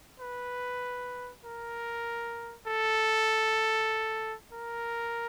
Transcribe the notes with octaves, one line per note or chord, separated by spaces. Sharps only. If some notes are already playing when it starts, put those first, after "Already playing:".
B4
A#4
A4
A#4